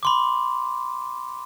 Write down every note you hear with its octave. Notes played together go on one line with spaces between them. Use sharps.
B5 C6 D6